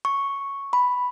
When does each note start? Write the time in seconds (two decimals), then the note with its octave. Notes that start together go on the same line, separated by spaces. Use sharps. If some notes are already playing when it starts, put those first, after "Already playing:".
0.05 C#6
0.73 B5